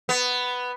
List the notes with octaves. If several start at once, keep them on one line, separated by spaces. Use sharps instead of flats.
B3